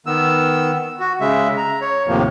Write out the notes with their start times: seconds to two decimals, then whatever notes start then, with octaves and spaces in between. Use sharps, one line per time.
0.06 D#3 B3 E6
1.00 F#4
1.21 C#3 G#3 E5
1.57 A#5
1.81 C#5
2.07 D#2 A2 C3 F3 A#3